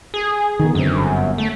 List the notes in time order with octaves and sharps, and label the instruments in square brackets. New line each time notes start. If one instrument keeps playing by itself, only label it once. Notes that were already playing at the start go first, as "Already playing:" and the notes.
[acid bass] G#4
[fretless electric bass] D#3 B3
[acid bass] F#2 [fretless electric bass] D3 C4
[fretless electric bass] G1
[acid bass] A3